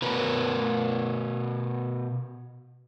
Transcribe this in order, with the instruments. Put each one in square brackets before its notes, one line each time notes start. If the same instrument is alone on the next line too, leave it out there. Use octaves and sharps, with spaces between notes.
[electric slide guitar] B2 A#4 B4